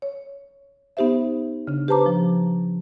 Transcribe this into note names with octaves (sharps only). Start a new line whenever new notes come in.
C#5
B3 D#4 G4 C5 E5
C#3 D4
G4 B4 C5 A5 A#5 D6
F3